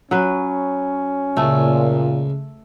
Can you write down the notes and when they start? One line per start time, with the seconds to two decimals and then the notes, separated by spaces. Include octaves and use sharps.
0.11 F#3 C#4 B4
1.37 C#2 A#2 A3